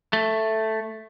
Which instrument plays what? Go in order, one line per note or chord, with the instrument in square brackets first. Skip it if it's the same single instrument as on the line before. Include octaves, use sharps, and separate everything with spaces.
[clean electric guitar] A3